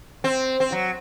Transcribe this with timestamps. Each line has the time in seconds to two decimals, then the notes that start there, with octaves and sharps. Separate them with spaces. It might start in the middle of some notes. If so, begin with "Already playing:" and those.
0.24 C4
0.60 C4
0.72 F#3